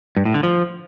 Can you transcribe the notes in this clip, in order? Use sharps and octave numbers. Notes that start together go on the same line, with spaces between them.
G2
A2
D3
F3